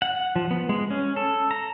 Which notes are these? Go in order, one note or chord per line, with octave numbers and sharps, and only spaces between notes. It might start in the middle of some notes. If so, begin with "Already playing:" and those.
F#5
F3
B3
G#3
C#4
A4
A#5